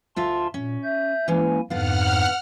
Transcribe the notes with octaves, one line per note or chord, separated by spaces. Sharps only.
D2 F4 E5 A5 C6
A#2 C#4
E5 G6
E3 G#3 A#3 C#4 E4 G#5
F2 G#2 D3 B3 F5 F#5 F6